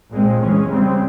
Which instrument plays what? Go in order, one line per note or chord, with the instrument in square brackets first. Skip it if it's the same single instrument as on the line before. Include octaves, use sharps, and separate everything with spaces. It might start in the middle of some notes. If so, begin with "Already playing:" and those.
[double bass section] A#2 G#3 C4
E3 G#3 C#4
C#3 G3 C4